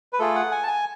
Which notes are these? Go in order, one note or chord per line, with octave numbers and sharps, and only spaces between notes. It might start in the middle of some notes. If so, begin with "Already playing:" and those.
B4
A3 F4 G#4 A4
F#5
G#5
A5
G#5